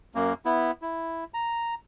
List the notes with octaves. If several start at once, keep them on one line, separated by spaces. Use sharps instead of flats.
F#2 A#3
B3 E4
E4
A#5